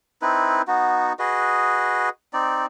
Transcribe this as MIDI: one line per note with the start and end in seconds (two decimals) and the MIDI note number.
0.22 0.62 60
0.22 0.62 63
0.22 0.62 64
0.22 0.62 71
0.68 1.13 59
0.68 1.13 63
0.68 1.13 66
1.19 2.09 66
1.19 2.09 68
1.19 2.09 71
1.19 2.09 75
2.33 2.66 60
2.33 2.66 63
2.33 2.66 74